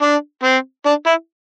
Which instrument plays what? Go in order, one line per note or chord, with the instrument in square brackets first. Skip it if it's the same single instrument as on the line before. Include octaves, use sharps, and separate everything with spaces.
[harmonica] D4
C4
D4
E4